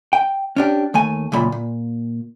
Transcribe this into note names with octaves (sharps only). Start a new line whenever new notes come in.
G5
C#4 D4 G4
D#2 A3 G#5
C#2 F#2 A#2 B5
A#2